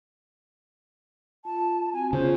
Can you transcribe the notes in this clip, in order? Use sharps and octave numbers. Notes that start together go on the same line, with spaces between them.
F4 A5
C4 F#4 G#5
C#3 B3 F4 C5